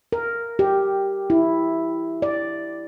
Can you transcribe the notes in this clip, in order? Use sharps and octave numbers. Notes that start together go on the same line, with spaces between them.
A#4
G4
E4
D5